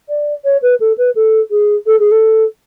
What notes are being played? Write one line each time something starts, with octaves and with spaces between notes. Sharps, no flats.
D5
C#5
B4
A4
B4
A4
G#4
A4
G#4
A4